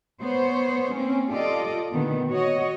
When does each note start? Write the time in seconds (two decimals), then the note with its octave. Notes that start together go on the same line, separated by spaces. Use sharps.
0.21 B3 C5 C#5
0.93 A#3 C4 C#4
1.31 F4 G4 A4 D5 D#5
1.93 A#2 D3 D#3 B3
2.29 F#4 C#5 D#5